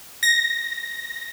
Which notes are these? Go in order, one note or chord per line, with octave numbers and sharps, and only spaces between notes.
A#6